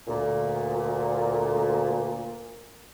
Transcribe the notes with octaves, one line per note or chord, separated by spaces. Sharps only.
D2 A#2